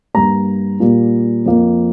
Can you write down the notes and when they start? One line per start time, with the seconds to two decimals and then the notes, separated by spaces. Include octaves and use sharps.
0.14 G2 G3 A#3 A#5
0.80 A#2 G3 A#3
1.46 F2 F3 A#3